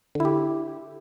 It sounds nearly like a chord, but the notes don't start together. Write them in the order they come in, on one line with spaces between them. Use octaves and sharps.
D3 E4 G4